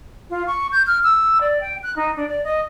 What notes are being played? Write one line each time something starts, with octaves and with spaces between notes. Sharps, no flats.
F4
C#6
G6
F6
E6
D5
G5
F#6
D#4
D4
D5
D#5